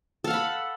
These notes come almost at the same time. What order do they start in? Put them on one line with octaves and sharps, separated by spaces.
A4 F5 F#5 B5